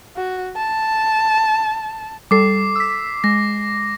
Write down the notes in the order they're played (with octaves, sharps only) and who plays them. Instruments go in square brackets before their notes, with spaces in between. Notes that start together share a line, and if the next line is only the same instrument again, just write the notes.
[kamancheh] F#4
A5
[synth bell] G3 A4 [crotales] D6 C7
[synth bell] E6 B6
[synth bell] G#3 [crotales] A#6